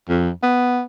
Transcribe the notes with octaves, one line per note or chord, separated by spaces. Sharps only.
F2
B3